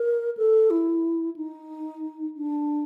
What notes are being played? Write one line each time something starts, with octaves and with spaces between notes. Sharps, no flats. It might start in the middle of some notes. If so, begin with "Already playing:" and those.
Already playing: A#4
A4
E4
D#4
D4